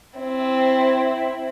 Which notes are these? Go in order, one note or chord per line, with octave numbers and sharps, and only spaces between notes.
C4 E4